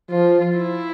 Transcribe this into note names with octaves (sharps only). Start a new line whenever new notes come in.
F3 F4
E4